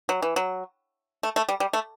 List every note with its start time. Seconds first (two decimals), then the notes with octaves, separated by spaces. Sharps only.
0.09 F#3
0.22 E3
0.36 F#3
1.23 A3
1.36 A3
1.49 G3
1.60 G3
1.73 A3